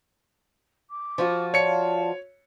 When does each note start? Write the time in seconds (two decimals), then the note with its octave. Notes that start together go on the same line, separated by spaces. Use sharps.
0.89 D6
1.18 F3 F4 F#4
1.54 C#5 D5 F5 A5 C#7